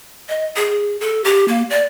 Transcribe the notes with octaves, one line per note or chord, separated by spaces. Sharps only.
D#5
G#4
A4
G4
A#3
D5